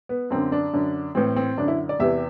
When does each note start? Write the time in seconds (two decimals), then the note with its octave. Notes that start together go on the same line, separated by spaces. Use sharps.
0.09 B3
0.30 F#2 D3 C4
0.52 D4
0.73 F#2 D3
1.15 A2 E3 C4
1.36 C4
1.58 F#2 D3 D4
1.68 E4
1.89 D5
1.99 E2 C3 E3 E5